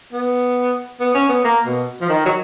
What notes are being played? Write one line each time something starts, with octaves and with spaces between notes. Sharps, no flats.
B3
B3
C#4
B3
A#3
B2
F3
D#3
F#3